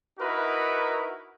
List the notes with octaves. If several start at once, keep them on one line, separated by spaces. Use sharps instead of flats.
D#4 E4 F#4 A#4 B4